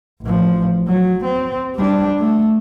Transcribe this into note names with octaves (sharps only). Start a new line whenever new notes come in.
A1 F3
F#3
C4
G3 D4
A3